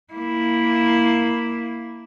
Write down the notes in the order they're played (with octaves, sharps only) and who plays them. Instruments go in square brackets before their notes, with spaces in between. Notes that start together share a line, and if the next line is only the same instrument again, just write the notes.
[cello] A#3 E4